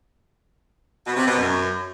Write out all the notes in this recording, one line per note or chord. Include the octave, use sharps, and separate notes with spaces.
B2
C3
B2
F#2